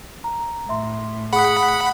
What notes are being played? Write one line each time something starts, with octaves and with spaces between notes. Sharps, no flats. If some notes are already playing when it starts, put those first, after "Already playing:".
A#5
A2 E5 C6
G#4 F#5 B5 D#6